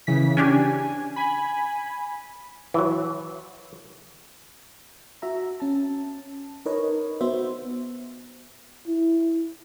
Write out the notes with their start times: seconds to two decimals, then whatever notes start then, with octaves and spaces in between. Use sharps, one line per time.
0.07 C#3 E3 B6
0.37 C#4 D4 G4 G#5
1.16 G#5 B5
2.74 E3 F#3
5.22 F#4 E5 A#5
5.60 C#4 A5
6.66 D#4 A#4 B4 C#5 D#5
7.21 B3 F#4 C5 E5
8.87 E4